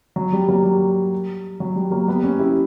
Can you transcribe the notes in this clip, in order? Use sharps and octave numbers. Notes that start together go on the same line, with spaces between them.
F#3
G3
F#3 A#3
G3
F#3
G3
F#3 A#3
G3 B3
A#3 C#4
E4 G4